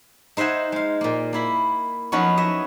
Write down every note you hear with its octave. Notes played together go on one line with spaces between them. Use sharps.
D#4 C5 E5 F#5 G#5
G#3 F5
A#2 A#3
A#3 E4 B5
F3 F#3 B3 C#4 D#4 F#4
C#5 D#5 E5